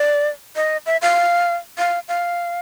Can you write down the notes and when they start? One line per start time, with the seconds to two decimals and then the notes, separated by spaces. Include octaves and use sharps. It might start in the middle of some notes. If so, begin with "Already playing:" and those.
Already playing: D5
0.56 D#5
0.86 E5
1.02 F5
1.78 F5
2.08 F5